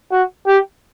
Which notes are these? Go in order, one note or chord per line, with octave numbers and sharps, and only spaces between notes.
F#4
G4